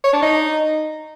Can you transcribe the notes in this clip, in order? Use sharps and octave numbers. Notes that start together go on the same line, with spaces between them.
C#5
D4
D#4